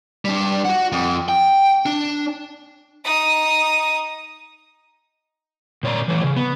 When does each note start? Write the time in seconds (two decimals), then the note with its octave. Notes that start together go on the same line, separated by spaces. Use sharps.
0.25 G3 D4
0.65 F#4 F#5
0.92 F2
1.29 G5
1.86 D4
3.04 D#4 D#6
5.83 A#2 C#5 D5 A#5
6.08 E3 A3 C#5
6.24 C#3
6.36 B3